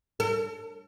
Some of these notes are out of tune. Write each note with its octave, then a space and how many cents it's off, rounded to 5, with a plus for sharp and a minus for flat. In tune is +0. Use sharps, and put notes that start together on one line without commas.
A4 +45